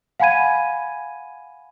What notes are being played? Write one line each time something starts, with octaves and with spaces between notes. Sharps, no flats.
F5 F#5 G#5 B5 G#6 D#7